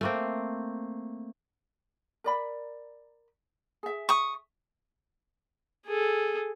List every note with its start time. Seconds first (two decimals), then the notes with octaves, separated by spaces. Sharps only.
0.01 A3 A#3 C4
2.24 A#4 D5 B5
3.83 G#4 E5
4.09 C#6 D#6
5.87 G#4 A4